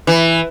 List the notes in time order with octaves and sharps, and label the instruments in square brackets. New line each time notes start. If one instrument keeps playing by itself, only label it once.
[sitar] E3